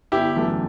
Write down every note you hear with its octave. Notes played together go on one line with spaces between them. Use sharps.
G1 E4 G4
F#2 E3 A3